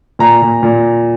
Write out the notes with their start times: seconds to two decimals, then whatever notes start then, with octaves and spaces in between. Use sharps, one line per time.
0.19 A#2 A#5
0.42 A#2
0.63 A#2